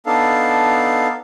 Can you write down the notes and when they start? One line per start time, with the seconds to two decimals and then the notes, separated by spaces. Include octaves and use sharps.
0.06 B3 D4 D#4 A4 F5